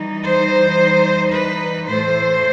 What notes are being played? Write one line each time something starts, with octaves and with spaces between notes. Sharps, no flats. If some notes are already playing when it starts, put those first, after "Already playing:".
Already playing: E3 G3 D#4
C5
B4
A2 E3 A3 C5